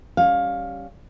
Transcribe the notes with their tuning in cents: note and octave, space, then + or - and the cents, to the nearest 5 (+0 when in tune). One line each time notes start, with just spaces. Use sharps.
G3 +0 C#4 +0 F5 +15